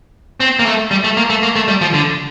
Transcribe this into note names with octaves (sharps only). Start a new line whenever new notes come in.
C4
A#3
A3
G3
A3
A#3
A3
A#3
A3
G3
F3
D3